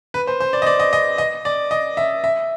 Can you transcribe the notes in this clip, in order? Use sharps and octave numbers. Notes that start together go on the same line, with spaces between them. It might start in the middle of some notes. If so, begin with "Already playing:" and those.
B4
C5
C5
D5
D#5
D5
D#5
D#5
D#5
D5
D#5
E5
E5